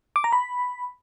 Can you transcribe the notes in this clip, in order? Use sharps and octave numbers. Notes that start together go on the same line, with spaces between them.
D6
A#5
B5